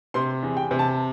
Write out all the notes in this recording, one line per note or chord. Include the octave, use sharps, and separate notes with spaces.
C3 C6
E2
G5
C3
A5